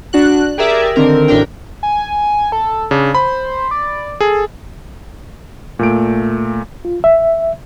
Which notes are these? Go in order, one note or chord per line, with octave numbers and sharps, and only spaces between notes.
D4 F#4 F#6
G4 G#4 A#4 D5 E5
D3 D#3 C4 A#4
A1 D2 D4 A#4 G5
G#5
A4
C#3 D4
C5 B5
D5
G#4 A4
A#2 A3 D7
F4
E5